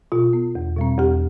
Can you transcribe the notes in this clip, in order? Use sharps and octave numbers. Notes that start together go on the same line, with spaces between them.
B2 F4
B3
E2
B2 G3 C4
E2 G4